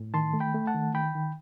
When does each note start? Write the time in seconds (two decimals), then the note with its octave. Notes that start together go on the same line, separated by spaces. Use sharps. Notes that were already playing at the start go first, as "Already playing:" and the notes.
Already playing: A2
0.14 D#3 A5 C6
0.34 A3
0.40 G5 B5
0.55 A3
0.67 F#5 A5
0.74 D#3
0.94 D#3 G5 B5
1.15 D#3